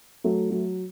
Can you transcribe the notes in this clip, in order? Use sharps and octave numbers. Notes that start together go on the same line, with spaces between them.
F#3 A3
F#3